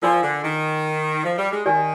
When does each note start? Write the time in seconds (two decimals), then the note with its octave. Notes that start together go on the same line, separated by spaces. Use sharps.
0.03 F3 F4 A#4 D5 G#5 C6
0.23 D3
0.43 D#3
1.24 F3
1.38 G3
1.52 G#3
1.66 D#3 G4 D5 G#5